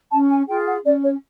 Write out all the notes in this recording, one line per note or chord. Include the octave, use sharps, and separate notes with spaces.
C#4 A5
G#5
F4 G#4 G5
F#5
C#4 D5
C#5